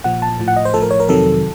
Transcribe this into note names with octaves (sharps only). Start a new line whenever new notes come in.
A#2 F3 F#5
A5
A2 F3
F#5
D#5
C5
A2 F3 A4
A#4
C#5
A#4
F2 C3 D#3 F#3 A4